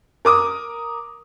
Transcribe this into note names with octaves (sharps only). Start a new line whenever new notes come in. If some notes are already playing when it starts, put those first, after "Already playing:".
A#4 D6 D#6